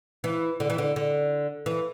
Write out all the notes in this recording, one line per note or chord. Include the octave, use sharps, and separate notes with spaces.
E3
D3
E3
D3
D3
E3